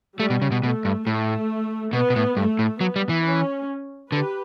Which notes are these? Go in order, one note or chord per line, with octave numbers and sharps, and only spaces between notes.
G3 A3
B2
C#3
B2
B2 A3
G2
A2 A3
B2 B3
B2
A2
G2 A3
A2
F#3 B3
G3
E3
C#4
D3 G4 B4